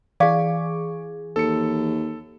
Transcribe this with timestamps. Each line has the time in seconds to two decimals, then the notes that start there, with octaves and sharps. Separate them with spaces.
0.20 E3 G#4 D5 F5 C#6 D6 G#6
1.36 D#2 A4 C#7